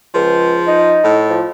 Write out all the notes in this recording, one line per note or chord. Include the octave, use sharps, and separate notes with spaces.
C#2 F3
D#4
A2
F3